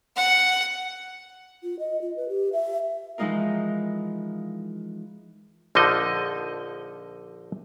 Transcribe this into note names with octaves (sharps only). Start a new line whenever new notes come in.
F#5
F4
D#5
F4
B4
G4
E5
E3 F3 G#3 D#4 F4 A#4
A#1 D3 F3 D#4 D#5